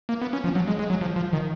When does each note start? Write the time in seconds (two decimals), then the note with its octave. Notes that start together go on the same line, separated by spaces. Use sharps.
0.09 A#3
0.22 B3
0.33 C#4
0.44 F3
0.55 F#3
0.68 G#3
0.79 G#3
0.90 F#3
1.01 F3
1.16 F3
1.33 D#3